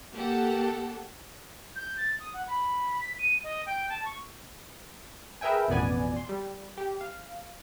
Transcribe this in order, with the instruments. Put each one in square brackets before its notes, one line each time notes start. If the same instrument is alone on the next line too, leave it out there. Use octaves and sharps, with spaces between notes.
[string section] A#3 G4 A4 F#5
[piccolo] G6
A6
D#6
F#5
B5
B6
D#7
D#5
G5
A5
C#6
[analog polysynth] G#4 A#4 B4 E5 G5 G#5
A1 F2 B2 B3 D5 G#5
C6
G3
G4
F5